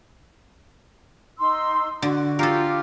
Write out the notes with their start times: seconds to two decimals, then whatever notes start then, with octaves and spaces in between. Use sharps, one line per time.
1.38 D#4 C6 E6
2.02 D3 F#4
2.39 F4 G4 A4 A#4